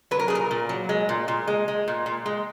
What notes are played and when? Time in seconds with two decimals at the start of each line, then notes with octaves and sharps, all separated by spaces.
0.11 F#3 B4
0.19 A#4
0.28 A#2 G#4
0.35 A#4
0.51 A#2
0.69 F#3
0.89 G#3
1.09 A#2
1.28 A#2
1.47 G#3
1.68 G#3
1.88 A#2
2.06 A#2
2.26 G#3